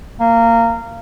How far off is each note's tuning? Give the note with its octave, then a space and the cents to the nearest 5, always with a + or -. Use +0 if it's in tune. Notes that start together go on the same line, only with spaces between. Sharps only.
A#3 -20